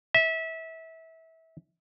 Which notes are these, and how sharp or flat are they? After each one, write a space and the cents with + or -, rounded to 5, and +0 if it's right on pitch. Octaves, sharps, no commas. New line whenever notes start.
E5 -25